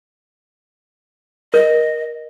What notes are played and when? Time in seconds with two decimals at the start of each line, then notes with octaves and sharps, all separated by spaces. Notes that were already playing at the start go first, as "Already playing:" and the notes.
1.54 A#4 D#5